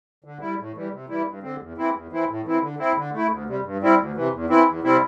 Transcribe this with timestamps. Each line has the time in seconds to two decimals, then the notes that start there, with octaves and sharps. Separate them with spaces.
0.24 D3
0.41 G3 E4
0.59 A2
0.75 E3 G3
0.92 C3
1.09 E3 G3 E4
1.26 G2
1.43 D3 C4
1.60 E2
1.77 E3 C4 E4
1.94 E2
2.11 E3 C4 E4
2.28 A2
2.44 E3 C4 E4
2.62 D3
2.79 C4 E4
2.97 D3
3.13 A3 E4
3.30 D2
3.47 C3 G3
3.64 G2
3.81 G3 C4 E4
3.98 D2
4.15 C3 E3
4.32 E2
4.49 E3 C4 E4
4.67 E2
4.83 C3 G3 C4 E4